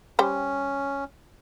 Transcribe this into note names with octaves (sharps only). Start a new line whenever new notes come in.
G3 C#4 C5 G5